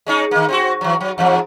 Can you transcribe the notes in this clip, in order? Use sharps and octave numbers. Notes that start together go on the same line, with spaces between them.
G#3 C#4 D#4
D#3 A#3
C4 D#4 F#4
E3 F#3
F#3
E2 G#2 F3